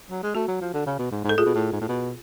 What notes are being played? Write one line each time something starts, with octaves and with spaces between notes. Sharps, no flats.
F#3
G#3
A3 F#4
F#3
F3
D3
C#3
B2
G#2
G#2
A4
A2 F4 G#4
B2
A2
G#2
A2
B2